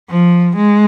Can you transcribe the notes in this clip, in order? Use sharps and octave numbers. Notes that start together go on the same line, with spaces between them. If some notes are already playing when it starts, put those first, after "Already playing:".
F3
G#3